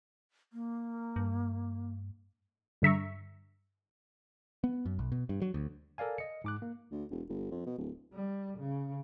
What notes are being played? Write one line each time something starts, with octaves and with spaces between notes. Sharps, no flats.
A#3
G2
G2 D3 E5 A#5 C#6
B3
F#2
B1
B2
G2
F#3
D2
A4 A#4 D5 F5 G#5
D#5 C#7
G#2 D6 F#6
A#3
D2
E1
G1
F2
B2
D1
G3
C#3